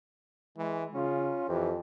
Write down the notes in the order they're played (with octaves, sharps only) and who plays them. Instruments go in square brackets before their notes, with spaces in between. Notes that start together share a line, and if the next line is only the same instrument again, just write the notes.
[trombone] E3 [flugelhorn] G#3
[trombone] C#3 [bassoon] C#4 [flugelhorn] F4
[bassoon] F2 [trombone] E3 [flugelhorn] G4